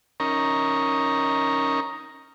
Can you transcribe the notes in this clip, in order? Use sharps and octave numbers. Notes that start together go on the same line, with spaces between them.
C#4 D#4 A#4 A#5 C#6